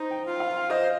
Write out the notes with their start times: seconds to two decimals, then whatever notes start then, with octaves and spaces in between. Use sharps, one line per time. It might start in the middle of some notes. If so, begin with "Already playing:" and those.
Already playing: D#4 C5
0.11 G5
0.26 F4
0.40 F5
0.70 C5 D#5